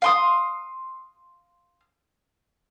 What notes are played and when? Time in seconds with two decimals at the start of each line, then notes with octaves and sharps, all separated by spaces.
0.02 F5 C6 D#6